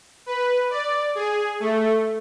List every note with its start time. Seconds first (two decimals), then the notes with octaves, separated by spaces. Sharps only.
0.26 B4
0.70 D5
1.15 G#4
1.60 A3